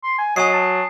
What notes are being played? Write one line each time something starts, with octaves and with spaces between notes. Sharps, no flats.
C6
G#5
F#3 D#5 G#5 D#6 C7
A5